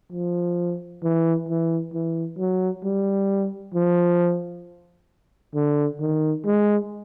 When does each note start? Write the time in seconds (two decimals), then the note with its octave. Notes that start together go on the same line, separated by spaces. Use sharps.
0.12 F3
1.03 E3
1.49 E3
1.94 E3
2.39 F#3
2.84 G3
3.75 F3
5.55 D3
6.01 D#3
6.46 G#3